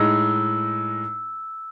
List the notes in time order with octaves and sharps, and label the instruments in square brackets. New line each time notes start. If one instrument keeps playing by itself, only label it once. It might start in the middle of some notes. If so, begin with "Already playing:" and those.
Already playing: [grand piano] A2 G#3 D#4 [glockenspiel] E6